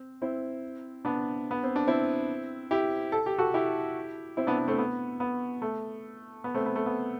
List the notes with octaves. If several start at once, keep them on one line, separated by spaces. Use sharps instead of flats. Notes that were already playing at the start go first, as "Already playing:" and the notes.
Already playing: C4
C4 E4
B3 D4
B3
C4
D4
C4 E4
E4 G4
A4
G4
F#4 A4
E4 G4
C4 E4
B3 D4
B3
A3 C4
B3
B3
A3
B3
A3 C4
B3
A3
B3